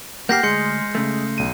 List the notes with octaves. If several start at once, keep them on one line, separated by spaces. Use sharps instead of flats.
A#3 G4 F#5 F6 G6 A#6 C7
D2 G#3 G#4 C6 G6 C#7
C#3 A3
B1 D#7